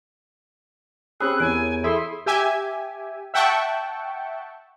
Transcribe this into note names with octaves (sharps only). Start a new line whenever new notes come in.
C4 C#4 G4 G#4 B5 E6 F#6
E2 A#4 C#5 G#5 D7
E4 G#4 A4 E5 C6 D#6
G4 E5 G#5
E5 F#5 G5 A5 C#6